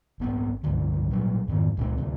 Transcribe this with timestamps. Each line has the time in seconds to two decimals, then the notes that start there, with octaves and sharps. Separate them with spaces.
0.20 G#1 B3 C4
0.64 C#2 G2 D3
1.11 A#2 F#3 G3
1.48 F2 G#2 D#3 B3
1.77 C#2 A#2 G#3 C4
1.98 D2 C3 C4